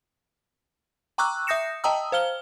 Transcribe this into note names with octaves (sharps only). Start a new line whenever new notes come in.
G5 A#5 C#6 D6 E6 F#6
E5 D#6 G6 A#6 C#7 E7
D#5 G5 A5 A#5 D#6 E6
C5 F5 F6 G7